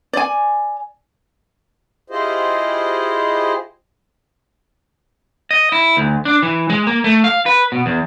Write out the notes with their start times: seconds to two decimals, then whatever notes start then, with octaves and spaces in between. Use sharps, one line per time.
0.13 D5 G#5
2.10 E4 F4 G4 G#4 C5 D#5
5.51 D#5
5.72 E4
5.97 D2
6.25 D4
6.42 E3
6.70 G#3
6.87 A#3
7.04 A3
7.24 F5
7.46 B4
7.72 B2
7.86 E2